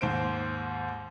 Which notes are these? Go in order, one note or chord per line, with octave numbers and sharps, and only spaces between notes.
D#2 G#2 C5 D7